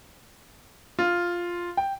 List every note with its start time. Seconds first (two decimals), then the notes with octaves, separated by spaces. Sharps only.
0.99 F4
1.77 G5